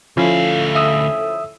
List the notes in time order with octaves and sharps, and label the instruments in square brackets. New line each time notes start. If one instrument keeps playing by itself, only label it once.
[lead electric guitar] D2 F5 [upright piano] F3 C#4 E4 [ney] A4
[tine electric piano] E5 D#6 E6